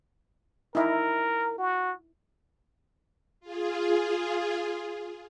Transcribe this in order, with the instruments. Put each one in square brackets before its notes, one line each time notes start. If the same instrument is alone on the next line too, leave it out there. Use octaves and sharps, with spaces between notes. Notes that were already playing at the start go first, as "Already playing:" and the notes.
[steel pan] D#4 E4 [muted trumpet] A#4
[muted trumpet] F#4
[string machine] F4 G#4